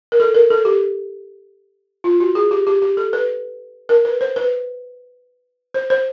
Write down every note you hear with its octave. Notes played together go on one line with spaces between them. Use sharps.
A#4
A4
A#4
A4
G4
F4
F#4
G#4
G4
G4
G4
A4
B4
A#4
B4
C5
B4
C5
C5